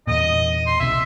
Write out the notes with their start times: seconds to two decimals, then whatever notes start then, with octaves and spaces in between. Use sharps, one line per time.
0.07 E2 A#2 D#5
0.66 C6
0.80 B1 C3 E5